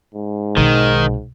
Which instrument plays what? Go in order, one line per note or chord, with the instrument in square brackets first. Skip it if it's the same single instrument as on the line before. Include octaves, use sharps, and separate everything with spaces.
[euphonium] G#2
[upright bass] B1 [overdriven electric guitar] D#3